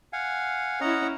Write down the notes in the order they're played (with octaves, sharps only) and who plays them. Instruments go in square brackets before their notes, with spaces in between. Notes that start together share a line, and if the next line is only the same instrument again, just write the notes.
[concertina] F5 F#5 G#5
[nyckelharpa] C#4 E4 [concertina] D#5 F#5 A#5